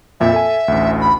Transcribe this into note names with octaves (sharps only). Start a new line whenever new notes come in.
F2 A#2 E5
A4 G#5
A1 D2
B5